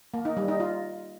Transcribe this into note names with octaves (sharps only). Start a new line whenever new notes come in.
A#3
D#4
G3
D#4
F4